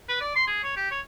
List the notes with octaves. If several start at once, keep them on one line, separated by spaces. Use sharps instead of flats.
B4
D5
C6
G#4
C#5
G4
C#5